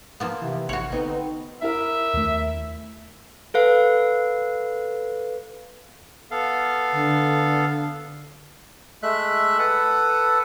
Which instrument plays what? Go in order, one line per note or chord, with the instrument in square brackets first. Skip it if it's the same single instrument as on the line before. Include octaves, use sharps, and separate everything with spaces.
[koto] F3 A#3 B3
[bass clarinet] C3 [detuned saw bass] E3
[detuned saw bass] A1 [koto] F#4 C#5
[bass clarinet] D3 [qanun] B3 C4 [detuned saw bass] D#4
[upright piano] E4 A#4 [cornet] E5
[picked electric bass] D#2 A3
[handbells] A4 B4 F5
[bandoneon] B3 A4 F5
[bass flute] D3
[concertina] G#3 A3 E5 F#6
A4 B4 F#5